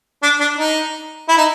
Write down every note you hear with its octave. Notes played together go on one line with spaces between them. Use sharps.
D4
D4
D#4
E4
D#4